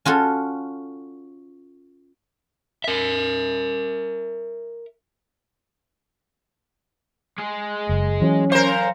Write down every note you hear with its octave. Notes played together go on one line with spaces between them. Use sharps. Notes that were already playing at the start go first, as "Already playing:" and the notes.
C#4 F4 F#4 A4
A#4 E5
G#3 G#4
F#1
E3 F#3 C#4
A#4 C5 F5 G#5